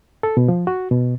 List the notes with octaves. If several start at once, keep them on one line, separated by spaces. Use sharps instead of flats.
A4
B2
F3
F#4
B2